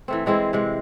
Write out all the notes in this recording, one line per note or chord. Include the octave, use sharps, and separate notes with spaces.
E3 A3 C4
E3 G#3 C4 E4
C3 G#3